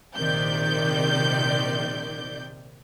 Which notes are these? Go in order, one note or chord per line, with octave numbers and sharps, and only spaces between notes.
A#1 C3 D#3 D5 G6